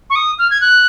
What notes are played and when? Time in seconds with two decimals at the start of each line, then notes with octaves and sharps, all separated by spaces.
0.10 C#6
0.16 D#6
0.39 F6
0.50 G#6
0.61 F#6